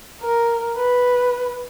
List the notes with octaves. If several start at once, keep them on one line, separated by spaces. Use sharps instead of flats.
A#4
B4